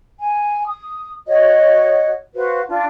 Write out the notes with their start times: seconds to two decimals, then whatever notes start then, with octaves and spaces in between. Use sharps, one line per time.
0.21 G#5
0.66 D#6
1.27 F#4 C#5 D#5 F#5
2.35 F#4 B4 C5 F5
2.68 D4 F4